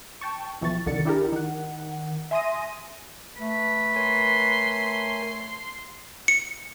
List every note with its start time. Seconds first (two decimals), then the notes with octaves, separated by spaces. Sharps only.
0.21 G5 A5 C#6
0.61 B1 E3 F3 C#6 A6
0.86 C2 D3 D#3 F#4 A6 C#7
1.05 D4 E4 G4 G#4 A#4
1.32 D#3 F#5
2.31 E5 G#5 C6 D#6 A#6 D#7
3.39 A3 B4
3.96 A#4 C#5 G#5 C6
6.28 C#7